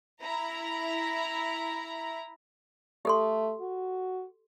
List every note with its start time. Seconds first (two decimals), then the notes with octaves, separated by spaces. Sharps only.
0.22 E4 A#5
3.05 A3 G4 A4 C6
3.60 F#4